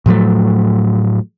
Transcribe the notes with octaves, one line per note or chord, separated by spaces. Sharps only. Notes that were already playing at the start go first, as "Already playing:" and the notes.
A2 F3 F#3 A3